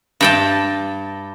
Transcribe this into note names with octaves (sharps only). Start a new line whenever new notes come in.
G2 G5 A5